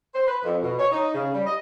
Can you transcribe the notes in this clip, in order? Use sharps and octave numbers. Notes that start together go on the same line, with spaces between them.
C5
B4
F2
B2
C#5
D#4
C#3
G3
D#5